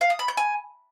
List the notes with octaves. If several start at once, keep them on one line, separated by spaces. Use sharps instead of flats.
F5
D#6
B5
G6
G#5